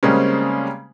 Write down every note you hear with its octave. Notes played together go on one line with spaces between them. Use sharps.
C#3 G3 G#3 A#3 C4 C#4